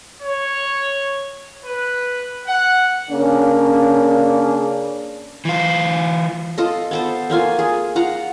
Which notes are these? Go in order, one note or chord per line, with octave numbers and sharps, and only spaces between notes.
C#5
B4
F#5
C#3 A#3 C#4 D4
E3 F4
F4 A4 D#5
B3 A4 C5
A3 A#3 F4 G#5
G#4
F4 F#5 A#5